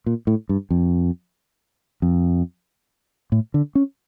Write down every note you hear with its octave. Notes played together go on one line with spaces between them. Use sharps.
A#2
A2
G2
F2
F2
A2
D3
C#4